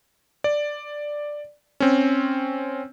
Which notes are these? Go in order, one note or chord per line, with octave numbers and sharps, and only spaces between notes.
D5
C4 C#4